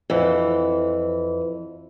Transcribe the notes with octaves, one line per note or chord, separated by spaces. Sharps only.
F2 E3